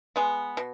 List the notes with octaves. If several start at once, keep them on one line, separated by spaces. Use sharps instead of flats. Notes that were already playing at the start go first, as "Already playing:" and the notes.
G#3 B3
B2